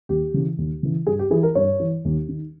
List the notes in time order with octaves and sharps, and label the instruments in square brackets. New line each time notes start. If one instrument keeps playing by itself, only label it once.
[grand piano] D#2 G4
C#3 E3
D#2
C#3 E3
G2 G#4
G4
E3 G#4
A#4
G2 C#5
E3
D#2
D#3